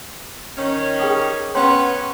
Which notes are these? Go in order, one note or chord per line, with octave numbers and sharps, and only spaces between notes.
D#3 C#4
G#4 G5 D#6
B3 C#4 C#5 G5 C6